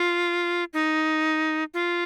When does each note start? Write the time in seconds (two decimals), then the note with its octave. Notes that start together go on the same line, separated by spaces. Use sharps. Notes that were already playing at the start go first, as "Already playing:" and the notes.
Already playing: F4
0.73 D#4
1.74 F4